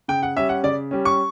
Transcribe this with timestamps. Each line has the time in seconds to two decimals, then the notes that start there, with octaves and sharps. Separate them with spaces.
0.08 C#3 G5
0.23 F#5
0.36 G3 C#4 E5
0.49 F#5
0.63 C#3 D5
0.91 G3 C#4
1.05 C#6